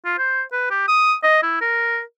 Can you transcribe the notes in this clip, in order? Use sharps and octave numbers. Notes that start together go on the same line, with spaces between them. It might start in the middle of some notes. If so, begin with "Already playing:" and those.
F4
C5
B4
G4
D#6
D#5
E4
A#4